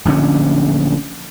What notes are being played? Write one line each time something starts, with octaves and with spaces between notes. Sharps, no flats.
D1 A#1 D3 C#4